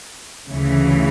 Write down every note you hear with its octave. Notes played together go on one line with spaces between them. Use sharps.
D2 C#3 E3